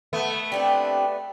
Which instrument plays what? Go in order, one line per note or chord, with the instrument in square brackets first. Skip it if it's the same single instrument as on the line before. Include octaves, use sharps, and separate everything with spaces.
[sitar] A3 B3
[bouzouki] C4 D4 G4 [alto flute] D5